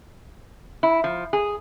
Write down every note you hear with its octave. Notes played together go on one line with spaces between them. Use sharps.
E4
F3
G#4